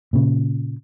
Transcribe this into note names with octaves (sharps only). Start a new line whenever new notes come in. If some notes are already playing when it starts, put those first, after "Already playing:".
A#2 C#3